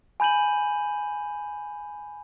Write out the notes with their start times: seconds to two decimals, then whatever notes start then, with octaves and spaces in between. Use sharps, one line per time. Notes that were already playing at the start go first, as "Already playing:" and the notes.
0.20 G#5 B5 G6 D#7 F#7